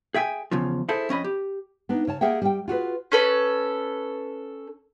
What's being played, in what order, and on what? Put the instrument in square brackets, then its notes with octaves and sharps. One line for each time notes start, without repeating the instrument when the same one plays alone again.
[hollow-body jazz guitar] G#4 E5 G5 G#5
E2 C#3 F3
E4 G#4 A4 C5
F2 C#4 D#5 B5
G4
[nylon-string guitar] B3 D4 D#4
C#3 C#5 A5
A#3 G#4 E5 F#5 G5
G3 G5
F4 F#4 G#4 B4
[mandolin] C#4 A4 B4